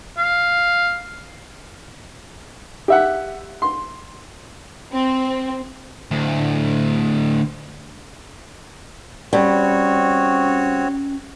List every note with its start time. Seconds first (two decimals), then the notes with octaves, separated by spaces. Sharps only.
0.18 F5
2.88 G4 E5 F#5
3.62 C6
4.92 C4
6.11 D2 A2
9.33 G3 C4 C#4 F#4 C#5